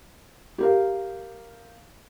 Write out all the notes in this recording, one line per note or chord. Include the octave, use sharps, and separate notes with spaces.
G4 A#4 F5